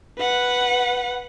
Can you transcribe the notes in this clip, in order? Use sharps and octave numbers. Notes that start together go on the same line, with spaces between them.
B4 F#5